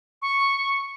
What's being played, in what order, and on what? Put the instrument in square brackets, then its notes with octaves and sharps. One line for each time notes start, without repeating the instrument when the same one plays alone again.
[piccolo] C#6